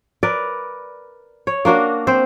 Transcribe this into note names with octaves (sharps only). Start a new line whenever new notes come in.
A#4 B4 D5
C#5
A#3 D4 F#4 A#4
C4 C5